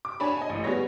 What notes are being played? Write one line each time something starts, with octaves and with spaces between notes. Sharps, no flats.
D6
D4 C#5 G#5 A5 B5
D#5 G#5
A1 A2
G3 B3 G#4 C#5 A#6